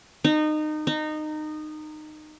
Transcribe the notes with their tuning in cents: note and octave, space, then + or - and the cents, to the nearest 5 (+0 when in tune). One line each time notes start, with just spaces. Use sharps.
D#4 -25
D#4 -20